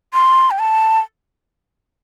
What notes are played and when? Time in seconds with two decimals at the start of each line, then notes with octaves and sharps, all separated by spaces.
0.14 C6
0.51 G5
0.59 A5